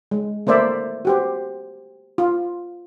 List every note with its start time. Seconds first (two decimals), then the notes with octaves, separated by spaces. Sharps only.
0.11 G#3
0.47 A3 A#3 C5 D5 E5
1.05 F#4 G4 C5
2.18 F4